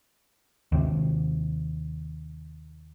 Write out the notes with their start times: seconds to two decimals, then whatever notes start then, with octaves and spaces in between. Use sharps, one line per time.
0.72 D#2 C3